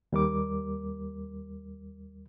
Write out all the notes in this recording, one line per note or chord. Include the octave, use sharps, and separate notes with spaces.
D#2 G3 A#4 D6